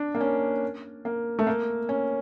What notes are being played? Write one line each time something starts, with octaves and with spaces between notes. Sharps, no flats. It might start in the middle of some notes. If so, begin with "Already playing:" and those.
Already playing: D4
A#3
C#4
A#3
A3
A#3
C#4